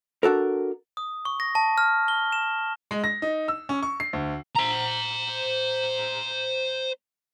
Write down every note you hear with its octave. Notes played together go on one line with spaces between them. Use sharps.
D4 F#4 A4 A#4
D#6
C#6
A#6
A5
F6
G7
E7
G#3
A#6
D#4
E6
C#4
C#6
C7
D2
C5 A#5